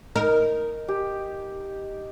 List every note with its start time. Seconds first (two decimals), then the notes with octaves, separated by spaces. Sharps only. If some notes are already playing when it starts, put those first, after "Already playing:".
0.16 D#4 A#4
0.88 G4